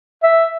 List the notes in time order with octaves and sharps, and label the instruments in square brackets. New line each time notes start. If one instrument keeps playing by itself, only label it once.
[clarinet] E5